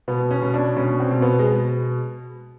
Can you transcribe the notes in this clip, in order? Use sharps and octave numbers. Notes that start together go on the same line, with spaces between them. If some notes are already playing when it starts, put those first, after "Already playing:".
B2 B3
C#4
B2
D4
B2 C#4
C4
B2
B3
G#3